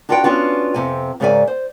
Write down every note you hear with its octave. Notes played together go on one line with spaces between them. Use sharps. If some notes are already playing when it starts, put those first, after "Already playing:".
D4 F4 F#4 B4 F#5 G5
B3 C#4 D4 F4 F#4
F2 C3 G#5
G#2 C#3 A#4 D5 E5 G#5
C5